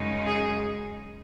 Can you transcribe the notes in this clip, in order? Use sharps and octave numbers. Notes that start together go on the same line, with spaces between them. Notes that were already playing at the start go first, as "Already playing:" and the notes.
Already playing: F#2 C#3 G#3 D#4
G#4